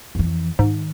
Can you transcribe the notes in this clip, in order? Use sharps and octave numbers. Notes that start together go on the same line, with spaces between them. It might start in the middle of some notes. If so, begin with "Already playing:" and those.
F2 E3
G#2 D#3